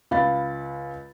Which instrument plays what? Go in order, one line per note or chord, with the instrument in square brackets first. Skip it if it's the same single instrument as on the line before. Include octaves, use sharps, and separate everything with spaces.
[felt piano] C#2 F5 B5 A6